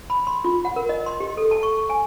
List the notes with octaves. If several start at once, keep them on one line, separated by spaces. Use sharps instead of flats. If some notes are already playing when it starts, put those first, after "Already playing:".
B5
C6
F4
F#5
A#4
D#5
C6
G4
A4
A5
C#6
G#5